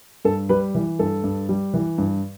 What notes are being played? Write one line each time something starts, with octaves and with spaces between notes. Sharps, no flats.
G2 A4
G3 B4
E3
G2 A4
G2
G3
E3
G2